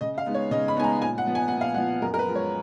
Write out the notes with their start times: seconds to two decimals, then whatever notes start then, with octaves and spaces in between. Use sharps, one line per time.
0.01 C#3 D#5
0.18 F5
0.26 G#3 B3 D#4
0.35 C#5
0.51 C#3 D#5
0.68 B5
0.76 G#3 B3 D#4 G#5
0.84 A#5
1.01 A#2 G#5
1.18 F#5
1.26 F3 B3
1.35 G#5
1.48 A#2 F#5
1.61 F5
1.74 F3 B3 F#5
2.02 F#2 A#4
2.14 A#4
2.19 B4
2.27 F3 G#3
2.35 C#5